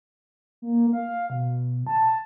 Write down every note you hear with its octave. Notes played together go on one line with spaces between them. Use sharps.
A#3
F5
B2
A5